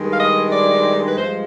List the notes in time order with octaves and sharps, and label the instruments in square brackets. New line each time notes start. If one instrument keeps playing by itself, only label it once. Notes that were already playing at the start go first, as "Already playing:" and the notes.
Already playing: [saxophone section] G2 D#3 G#3
F5
D#5
D5
B4
G2 F3 G#3 C5